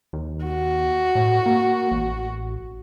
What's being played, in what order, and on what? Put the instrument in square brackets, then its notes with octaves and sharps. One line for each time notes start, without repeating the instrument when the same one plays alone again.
[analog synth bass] D#2
[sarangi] F#4
[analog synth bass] A2
A#3
A1